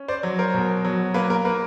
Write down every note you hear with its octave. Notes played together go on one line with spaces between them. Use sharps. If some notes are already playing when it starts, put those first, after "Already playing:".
Already playing: C#4
C5 D5
F#3
A#4 C5
B2
F#3
A#3 B4
A#4
A#3 B4